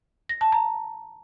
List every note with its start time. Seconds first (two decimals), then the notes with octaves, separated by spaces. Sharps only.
0.29 A#6
0.41 A5
0.52 A#5